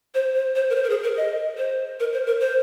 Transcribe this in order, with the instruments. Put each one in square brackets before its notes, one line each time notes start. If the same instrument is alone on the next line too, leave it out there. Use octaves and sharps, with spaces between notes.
[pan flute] C5
C5
C5
A#4
C5
A#4
G#4
A#4
D#5
C5
A#4
C5
A#4
C5